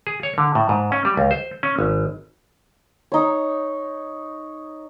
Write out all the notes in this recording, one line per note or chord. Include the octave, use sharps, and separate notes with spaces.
G#4
C#5
D3
A2
G#2
C#4
G3
C#2
C5
C#4
G#1
D#4 C#5